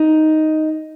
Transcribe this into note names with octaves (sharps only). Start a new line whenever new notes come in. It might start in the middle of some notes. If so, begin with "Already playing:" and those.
Already playing: D#4